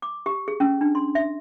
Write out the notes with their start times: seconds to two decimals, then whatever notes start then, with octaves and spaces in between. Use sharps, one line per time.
0.02 D6
0.26 G4
0.48 G#4
0.60 C#4
0.81 D4
0.95 C6
1.15 E5